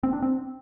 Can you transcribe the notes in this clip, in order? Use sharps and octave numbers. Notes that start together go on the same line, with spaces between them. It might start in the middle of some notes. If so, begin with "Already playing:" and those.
C4
D4
C4